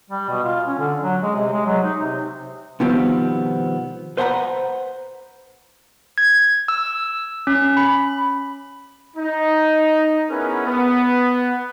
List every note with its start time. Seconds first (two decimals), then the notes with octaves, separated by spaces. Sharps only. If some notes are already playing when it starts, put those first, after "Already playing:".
0.10 G3
0.29 B2
0.44 F4
0.67 C#4
0.79 D3
1.03 F#3
1.23 G#3
1.36 C3
1.53 G#3
1.66 F#3
1.83 D#4
2.02 C3
2.80 B2 D#3 F3 G3 B3 C4
4.17 B4 C5 F#5 G#5 A#5 B5
6.18 G#6
6.68 E6
7.47 C#4
7.77 B5
9.17 D#4
10.30 B3 C#4 E4 G#4 A#4 B4
10.67 B3